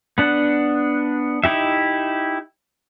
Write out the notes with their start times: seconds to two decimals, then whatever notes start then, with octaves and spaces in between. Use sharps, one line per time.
0.18 B3 D4 F#5
1.44 D#4 E4 G4 E5